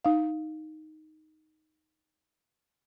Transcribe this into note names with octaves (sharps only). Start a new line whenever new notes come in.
D#4 F5